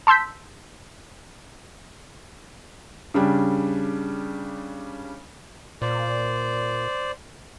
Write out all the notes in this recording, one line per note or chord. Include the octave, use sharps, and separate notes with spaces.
A5 C6 E6 G6 B6
C#3 G3 D4
A#2 C5 D5